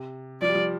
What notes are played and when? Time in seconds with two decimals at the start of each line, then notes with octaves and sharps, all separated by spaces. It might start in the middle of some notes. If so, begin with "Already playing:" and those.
Already playing: C3
0.42 F3 D5
0.49 G3
0.55 F3